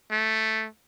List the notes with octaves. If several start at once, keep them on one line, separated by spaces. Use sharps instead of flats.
A3